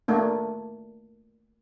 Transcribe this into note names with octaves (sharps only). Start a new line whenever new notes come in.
A3 A#3 D4